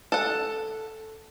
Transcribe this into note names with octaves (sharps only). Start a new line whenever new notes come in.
A4 F#5